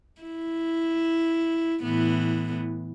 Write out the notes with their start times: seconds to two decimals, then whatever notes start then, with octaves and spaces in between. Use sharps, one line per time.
0.22 E4
1.83 A2 E3 B3